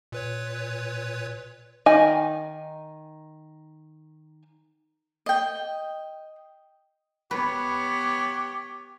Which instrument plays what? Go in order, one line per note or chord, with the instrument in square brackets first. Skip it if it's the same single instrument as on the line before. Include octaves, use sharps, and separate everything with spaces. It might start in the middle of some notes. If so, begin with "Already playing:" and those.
[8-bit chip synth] A#2 B4 C#5
[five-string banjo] D#3 D#5 G#5
[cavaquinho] D#5 G5
[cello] B3 C#5 [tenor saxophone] G4 [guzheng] B4